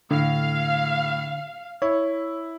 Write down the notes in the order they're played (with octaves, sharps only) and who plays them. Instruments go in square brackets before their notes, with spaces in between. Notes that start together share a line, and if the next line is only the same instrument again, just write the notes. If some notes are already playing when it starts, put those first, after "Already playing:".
[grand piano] A2 [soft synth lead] D3 [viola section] F5
[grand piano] E4 [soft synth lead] C#5